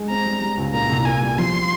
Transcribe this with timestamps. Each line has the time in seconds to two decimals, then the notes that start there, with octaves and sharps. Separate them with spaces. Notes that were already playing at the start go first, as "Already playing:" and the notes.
Already playing: G#3
0.10 C4 A#5
0.26 G3
0.42 G3
0.57 C#2
0.74 A#2 A#5
0.90 C2
1.05 A#3 G#5
1.22 G3
1.38 F3 C6